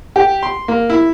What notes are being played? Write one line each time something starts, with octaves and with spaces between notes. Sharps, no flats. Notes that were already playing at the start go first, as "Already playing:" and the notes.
G4
C6
A#3
E4